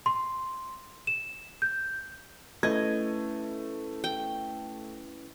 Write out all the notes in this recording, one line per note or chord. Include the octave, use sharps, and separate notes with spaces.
C6
E7
G6
A3 C#4 E4 B4 D#5 G#6
G5